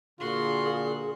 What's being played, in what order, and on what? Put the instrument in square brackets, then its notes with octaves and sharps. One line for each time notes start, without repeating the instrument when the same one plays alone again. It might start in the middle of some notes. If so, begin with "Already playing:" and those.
[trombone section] A#2 D3 [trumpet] F4 [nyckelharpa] F#4 C6 [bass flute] G#4